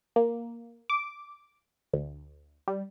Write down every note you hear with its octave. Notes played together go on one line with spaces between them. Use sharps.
A#3
D6
D2
G3